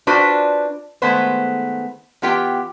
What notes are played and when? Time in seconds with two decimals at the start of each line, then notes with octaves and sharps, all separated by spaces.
0.07 D4 F4 F#4 B4 C5 D5
1.02 D#3 G#3 A3 B3 B4 C5
2.22 E3 B3 F4 G4 G5